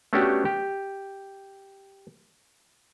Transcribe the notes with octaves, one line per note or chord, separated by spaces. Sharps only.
A3 B3 C#4 D4 F#4 G4
G4